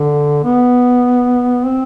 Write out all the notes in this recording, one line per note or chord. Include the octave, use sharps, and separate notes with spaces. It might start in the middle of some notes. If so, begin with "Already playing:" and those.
Already playing: D3
B3
C4